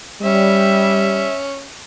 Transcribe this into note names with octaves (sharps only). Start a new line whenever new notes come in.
G3 C#4 E5